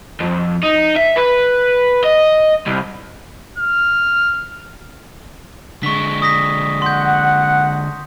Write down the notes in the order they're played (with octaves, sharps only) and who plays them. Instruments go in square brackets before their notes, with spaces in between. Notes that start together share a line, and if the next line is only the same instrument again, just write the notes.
[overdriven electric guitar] F2
D#4
E5
B4
D#5
C2
[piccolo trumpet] F6
[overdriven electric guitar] D3 G#3 [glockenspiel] C#6 B6
[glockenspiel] D#6 A#6 B6
[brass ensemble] F#5 [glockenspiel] C6 G6